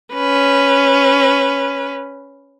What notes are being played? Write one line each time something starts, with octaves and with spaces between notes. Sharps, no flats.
C#4 B4